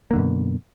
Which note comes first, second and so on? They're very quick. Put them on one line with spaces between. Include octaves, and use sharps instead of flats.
A#3 D3 F#2 B2